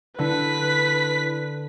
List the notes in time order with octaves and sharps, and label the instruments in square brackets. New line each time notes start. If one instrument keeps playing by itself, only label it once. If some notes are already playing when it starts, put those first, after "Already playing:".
[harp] D3 [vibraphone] E4 [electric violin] B4 B6